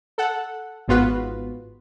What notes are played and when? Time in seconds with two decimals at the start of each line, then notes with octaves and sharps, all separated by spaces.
0.18 A4 F#5
0.88 G#1 G#2 B3 F4 F#4 B4